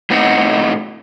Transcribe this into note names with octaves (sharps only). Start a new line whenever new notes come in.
A2 B3 C4 D#4 D#5 F#5